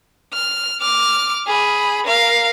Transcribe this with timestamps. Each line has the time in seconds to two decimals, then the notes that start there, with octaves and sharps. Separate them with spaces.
0.33 F6
0.81 D6 F6
1.47 G#4 B5
2.06 A#4 F5